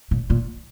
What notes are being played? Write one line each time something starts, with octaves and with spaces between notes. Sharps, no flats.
A#2
A#2